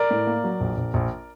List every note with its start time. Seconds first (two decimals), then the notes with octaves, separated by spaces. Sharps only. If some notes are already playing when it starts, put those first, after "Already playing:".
Already playing: A#4 D5
0.11 A2
0.27 A#3
0.44 F#3
0.61 A#1
0.77 A#1
0.94 A#1